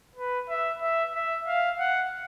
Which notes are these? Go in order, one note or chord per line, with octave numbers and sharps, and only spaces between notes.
B4
E5
E5
E5
F5
F#5